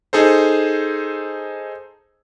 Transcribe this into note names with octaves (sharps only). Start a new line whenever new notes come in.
D#4 G#4 A4 C5